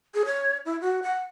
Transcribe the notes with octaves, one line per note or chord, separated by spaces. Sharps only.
G#4
C#5
E4
F#4
F#5